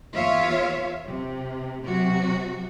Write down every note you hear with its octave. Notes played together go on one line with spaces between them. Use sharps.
E2 F4 C#5 E5 F5
C3
C3 F#3 F#4